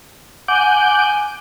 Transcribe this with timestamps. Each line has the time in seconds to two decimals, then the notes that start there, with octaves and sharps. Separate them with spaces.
0.48 F#5 G#5 D6 G6